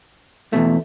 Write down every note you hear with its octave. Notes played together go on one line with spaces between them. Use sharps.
E2 B2 A3